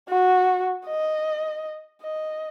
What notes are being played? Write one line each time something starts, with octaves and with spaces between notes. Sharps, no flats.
F#4
D#5
D#5